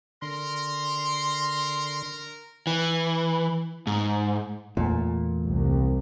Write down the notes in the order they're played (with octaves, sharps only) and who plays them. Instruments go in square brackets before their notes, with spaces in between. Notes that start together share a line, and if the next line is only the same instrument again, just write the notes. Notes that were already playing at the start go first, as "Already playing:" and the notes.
[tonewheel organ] D3 [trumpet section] A#4 [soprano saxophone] C6
[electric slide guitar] E3
G#2
[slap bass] E2 A3 [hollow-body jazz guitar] A#2
[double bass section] C2